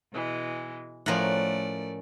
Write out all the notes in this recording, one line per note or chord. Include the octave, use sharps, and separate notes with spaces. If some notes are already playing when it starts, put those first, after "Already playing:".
B2 E3 G#3
A2 F3 A3 C#4 A#4 D5 F#5